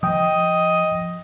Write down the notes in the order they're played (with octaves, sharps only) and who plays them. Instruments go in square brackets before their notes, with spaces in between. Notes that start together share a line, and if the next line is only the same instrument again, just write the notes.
[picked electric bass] F3 [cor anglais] D#5 [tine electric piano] G5 D#6